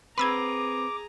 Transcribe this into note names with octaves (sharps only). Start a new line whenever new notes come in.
C4 G#4 B4 A#5 B5 D6 E6 G#6